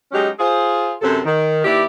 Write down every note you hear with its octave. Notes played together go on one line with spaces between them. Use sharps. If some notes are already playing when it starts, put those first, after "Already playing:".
F#3 G#3 C#4 D#4 G4
F4 G#4 C5
F#2 C3 C4 A4
D#3
D#2 E4 G4 B4 D5 E5